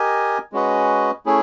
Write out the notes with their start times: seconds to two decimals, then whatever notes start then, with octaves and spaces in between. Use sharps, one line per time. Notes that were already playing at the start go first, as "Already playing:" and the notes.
Already playing: G4 A#4 D#5 G#5
0.52 G#3 C#4 F#4 B4 D#5
1.26 A3 C#4 E4 G#4